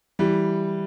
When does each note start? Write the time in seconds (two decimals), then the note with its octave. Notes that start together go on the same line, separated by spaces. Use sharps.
0.19 E3 G3